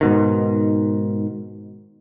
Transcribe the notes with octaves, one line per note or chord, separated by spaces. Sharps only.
G#2 B2 D#3